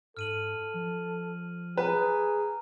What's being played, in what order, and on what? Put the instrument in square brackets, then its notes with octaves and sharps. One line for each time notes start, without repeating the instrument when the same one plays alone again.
[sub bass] G#2 [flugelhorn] A4 [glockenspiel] F6 D#7 F#7
[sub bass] F3
[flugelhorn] G#4 [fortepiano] B4 [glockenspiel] A#5